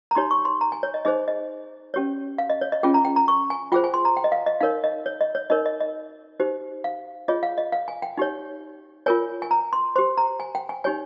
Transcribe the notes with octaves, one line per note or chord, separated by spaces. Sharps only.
A#5
D#4 G4 C#5 C6
C#6
C6
A#5
G#5
C#5
D#5
D#4 G#4 C5 D#5
D#5
C#4 G4 C#5
F5
D#5
C#5
D#5
C#4 F4 G#4 G5
A#5
G5
A#5
C#6
G#5
F4 G#4 C5 G5
G#5
C6
A#5
G5
D#5
F5
D#5
D#4 A#4 C#5 F5
D#5
C#5
D#5
C#5
D#4 A#4 C#5 D#5
D#5
D#5
D#4 G4 C5
F5
F4 G#4 C#5 D#5
F5
D#5
F5
G#5
G5
D#4 G4 C#5
F4 A#4 C#5 G#5
G#5
A#5
C6
G4 C5 C6
A#5
G#5
G5
G#5
D#4 G4 C#5 G#5